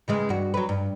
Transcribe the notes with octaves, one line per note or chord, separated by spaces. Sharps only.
C#3 E3 G#3
G2 F#4
F#3 B4
G2